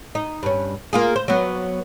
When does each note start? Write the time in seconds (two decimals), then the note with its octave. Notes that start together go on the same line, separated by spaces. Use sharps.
0.15 D#4
0.43 G2 C#4
0.93 A#3 F4 G#4
1.16 C5
1.28 F#3 B3